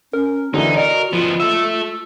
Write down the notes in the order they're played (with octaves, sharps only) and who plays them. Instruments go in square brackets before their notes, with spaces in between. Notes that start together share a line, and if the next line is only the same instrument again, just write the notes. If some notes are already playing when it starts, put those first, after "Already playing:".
[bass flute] C#4 [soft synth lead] A#4
[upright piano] D3 E3 [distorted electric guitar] D#4 [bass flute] F#4
[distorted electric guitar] A#4 [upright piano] D5 [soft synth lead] D#5
[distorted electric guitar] F3 B3 [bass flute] F4
[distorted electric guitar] A4 E5 [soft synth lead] E6